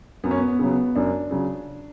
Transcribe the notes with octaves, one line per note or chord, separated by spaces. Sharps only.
F#2 B3
C#4
B3
B3
C#3 F#3
B3
F#2 D4
C#3 F#3